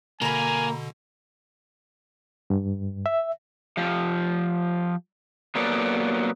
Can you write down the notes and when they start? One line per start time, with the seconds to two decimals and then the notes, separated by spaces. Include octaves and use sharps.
0.22 B2 D3 A#3 G#5 A#5 B5
2.50 G2
3.06 E5
3.77 F3 G4
5.55 F#3 A#3 B3 G4 A4 D5